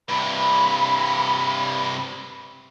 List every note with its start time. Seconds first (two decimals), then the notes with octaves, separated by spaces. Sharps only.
0.09 G2 C3 B5